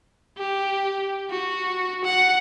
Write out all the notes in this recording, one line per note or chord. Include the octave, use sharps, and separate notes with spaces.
G4
F#4
F#5